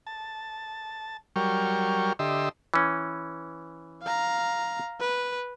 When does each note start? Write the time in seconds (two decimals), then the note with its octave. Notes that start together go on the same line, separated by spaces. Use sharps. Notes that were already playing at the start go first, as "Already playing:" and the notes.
0.07 A5
1.36 F#3 G3 A#4 G5 C#6 F6
2.19 D3 G4 D#5 E5 C6 E6
2.74 E3 C#4
4.03 F5 A#5
5.00 B4